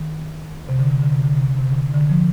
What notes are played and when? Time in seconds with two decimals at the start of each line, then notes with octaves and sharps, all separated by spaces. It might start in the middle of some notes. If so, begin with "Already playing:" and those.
Already playing: D#3
0.69 C3
0.79 D3
0.90 C3
1.02 D3
1.13 C3
1.24 D3
1.35 C3
1.48 D3
1.58 C3
1.69 D3
1.80 C3
1.94 D3
2.09 F3